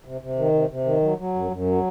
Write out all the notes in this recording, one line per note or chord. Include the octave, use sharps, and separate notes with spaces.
C3
C3
D#3
C3
C3
D#3
F#3
F#3
F#2
F#2
F#3